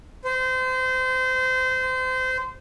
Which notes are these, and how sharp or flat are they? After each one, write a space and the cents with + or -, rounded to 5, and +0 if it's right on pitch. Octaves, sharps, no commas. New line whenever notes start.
C5 -25